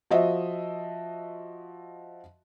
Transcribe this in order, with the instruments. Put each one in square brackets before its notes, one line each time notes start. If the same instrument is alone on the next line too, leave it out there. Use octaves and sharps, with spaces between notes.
[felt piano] F3 F#4 D#5 E5